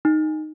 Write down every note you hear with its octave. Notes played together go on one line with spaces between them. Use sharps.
D#4